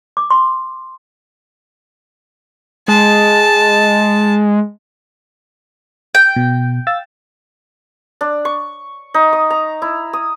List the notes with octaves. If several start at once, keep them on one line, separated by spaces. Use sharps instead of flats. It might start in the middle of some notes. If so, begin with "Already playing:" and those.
D6
C6
G#3 A5
G5
B2
F5 E6 A6
D4
C#6
D#4
D#6
A#5
E4
D#6